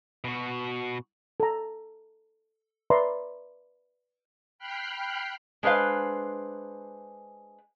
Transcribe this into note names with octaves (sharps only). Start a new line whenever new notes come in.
B2 F#4
A4 A#5
B4 D5 E5 A#5 C6
G5 B5 F6 F#6 C7
G#3 D4 B4 C5 F5